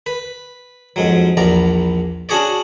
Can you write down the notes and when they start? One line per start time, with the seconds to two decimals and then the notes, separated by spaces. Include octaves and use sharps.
0.06 B4
0.96 F2 G#2 F#3
1.37 A#1 E2 D5 A#5
2.29 C#4 D4 F#4 G#4 C#5 D5